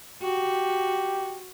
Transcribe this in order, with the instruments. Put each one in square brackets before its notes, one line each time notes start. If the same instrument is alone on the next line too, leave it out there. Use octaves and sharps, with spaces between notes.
[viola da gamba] F#4 [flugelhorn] G4